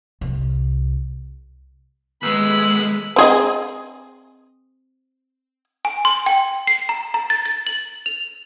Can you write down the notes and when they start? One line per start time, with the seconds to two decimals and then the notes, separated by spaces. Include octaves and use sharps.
0.21 C2
2.23 D#2 G#3 B3 B5 E6
3.16 C4 G#4 D#5
5.85 G#5
6.05 C6
6.26 G5
6.67 C7
6.89 A#5
7.14 A#5
7.30 A6
7.46 A6
7.67 F#7
8.06 F7